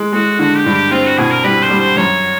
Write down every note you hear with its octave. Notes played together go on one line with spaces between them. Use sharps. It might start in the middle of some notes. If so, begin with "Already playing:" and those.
Already playing: G#3
G#3 F#4
D3 F#4
G4
G2
G4
C4 F4
F#4
B2 G#4
A#4
G3 B4
C5
G3
C5
F#2 C#5